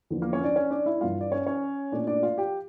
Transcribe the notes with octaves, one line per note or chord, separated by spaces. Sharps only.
E2 D3 F3 A#3
A#3 A#4
C#4 C#5
D4 D5
C#4 C#5
D4 D5
E4 E5
G2 E3 G3 F4 F5
D5
C#4 C#5
C#4 C#5
A#2 A3 D4 D5
D4 D5
F4 F5
G4 G5